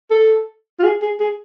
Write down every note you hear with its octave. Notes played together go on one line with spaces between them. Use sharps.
A4
F4
G#4
G#4
G#4